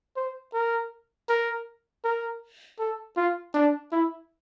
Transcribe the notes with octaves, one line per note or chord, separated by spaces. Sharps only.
C5
A#4
A#4
A#4
A4
F4
D4
E4